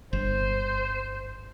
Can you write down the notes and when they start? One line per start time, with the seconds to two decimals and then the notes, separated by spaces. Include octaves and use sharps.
0.13 G1 C5